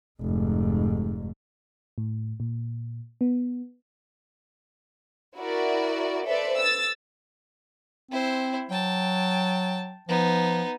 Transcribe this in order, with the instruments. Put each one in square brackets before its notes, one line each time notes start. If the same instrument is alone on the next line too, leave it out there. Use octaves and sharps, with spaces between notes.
[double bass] F1 G#2
[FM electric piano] A2
A#2
B3
[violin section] E4 F#4 A#4 D5
A4 B4 C5 D5 E5
E6 A6
[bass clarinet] C4 [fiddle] E4 C5
[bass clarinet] F#3 [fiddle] G5 A5
[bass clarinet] F3 [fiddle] B3 D#4